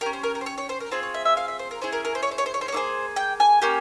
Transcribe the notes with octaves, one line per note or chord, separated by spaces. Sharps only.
C#4 G4 A#4
C5
A#4
A#4
C5
C#5
C#5
C5
A#4
C4 F4 G#4 C5
C#5
E5
E5
F5
E5
C5
A#4
C#4 E4 G#4 C5
A#4
A#4
C5
C#5
C5
C#5
C5
C#5
C5
C#5
A#3 E4 G#4 C5
G5
G#5
A#3 C#4 G4